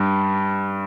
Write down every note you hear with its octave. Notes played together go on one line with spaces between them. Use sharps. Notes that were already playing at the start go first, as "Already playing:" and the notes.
Already playing: G2 G3